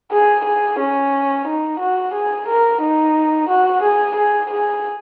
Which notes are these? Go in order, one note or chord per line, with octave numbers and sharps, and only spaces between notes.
G#4
G#4
C#4
D#4
F#4
G#4
A#4
D#4
F#4
G#4
G#4
G#4